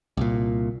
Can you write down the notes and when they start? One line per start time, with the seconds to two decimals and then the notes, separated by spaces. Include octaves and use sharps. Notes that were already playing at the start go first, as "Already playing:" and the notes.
0.17 C2 A#2